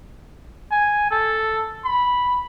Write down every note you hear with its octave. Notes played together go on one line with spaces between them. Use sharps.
G#5
A4
B5